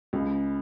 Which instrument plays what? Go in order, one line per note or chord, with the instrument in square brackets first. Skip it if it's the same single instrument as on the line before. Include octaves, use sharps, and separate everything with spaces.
[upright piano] C#2 C#3